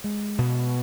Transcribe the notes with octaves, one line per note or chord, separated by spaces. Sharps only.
G#3
B2